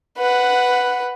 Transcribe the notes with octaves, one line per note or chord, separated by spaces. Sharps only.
B4 F#5